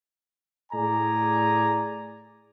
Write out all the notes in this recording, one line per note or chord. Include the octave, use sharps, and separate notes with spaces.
A2 G#4 D5 G#5 A#5